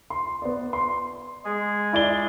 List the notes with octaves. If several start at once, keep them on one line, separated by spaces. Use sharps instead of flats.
C6
B3 D5
C6
G#3 G#4
E4 D5 G7